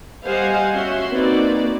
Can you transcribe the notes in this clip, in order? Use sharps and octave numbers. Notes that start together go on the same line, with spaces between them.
G3 C5 D#5 F5 F#5 G#5
C#4 F#4 E5 C6
A#3 C4 D#4 F#4 B4 D5